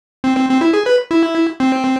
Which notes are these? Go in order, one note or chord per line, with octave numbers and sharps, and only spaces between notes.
C4
C4
C4
E4
G#4
B4
E4
C4